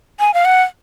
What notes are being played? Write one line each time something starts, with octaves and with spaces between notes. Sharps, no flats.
G#5
F5
F#5